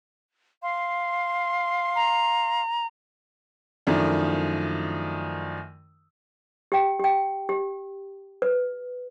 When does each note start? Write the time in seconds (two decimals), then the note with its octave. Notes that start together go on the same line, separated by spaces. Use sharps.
0.62 F5 C6
1.96 A#5
3.87 F#2 D#3 F3 A3 D4 E4
6.72 G4 G5
7.00 G4 G5
7.49 G4
8.42 B4